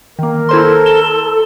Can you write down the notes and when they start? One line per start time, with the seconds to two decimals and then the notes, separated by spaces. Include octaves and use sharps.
0.19 D#3 A#3 A#4
0.49 E4 A4 C5 C6
0.86 E7 G7